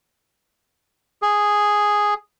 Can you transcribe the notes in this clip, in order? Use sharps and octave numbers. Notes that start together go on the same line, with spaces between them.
G#4